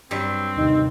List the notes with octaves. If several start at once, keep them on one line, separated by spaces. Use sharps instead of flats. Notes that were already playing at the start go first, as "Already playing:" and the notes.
G2 F#3 G3 C4
D#2 C3 D#4